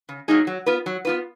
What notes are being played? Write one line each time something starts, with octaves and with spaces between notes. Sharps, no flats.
C#3
F#3 A#3 D#4 G#4
F#3
B3 F4 B4
F#3
B3 F4 B4